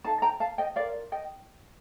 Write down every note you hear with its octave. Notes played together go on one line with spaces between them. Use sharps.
D#4 A4 F5 A5
G5 A#5
F5 A5
D#5 G5
F4 A#4 D5 F5
D#5 G5